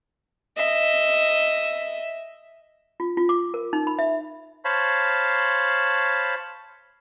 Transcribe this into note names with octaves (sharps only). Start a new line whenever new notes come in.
D#5 E5
F4
F4
D6
A#4
D#4
B5
E5
C5 C#5 F5 A5 B5